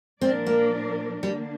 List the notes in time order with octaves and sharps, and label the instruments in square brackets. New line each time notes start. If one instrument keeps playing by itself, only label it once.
[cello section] A#2 F3 D4 A#4 D5 [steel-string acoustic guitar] C4
[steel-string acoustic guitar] A#3
[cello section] D3 A#3 D4 [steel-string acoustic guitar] G3